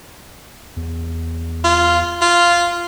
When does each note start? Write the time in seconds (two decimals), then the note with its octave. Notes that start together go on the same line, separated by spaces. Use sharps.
0.76 E2
1.64 F4
2.22 F4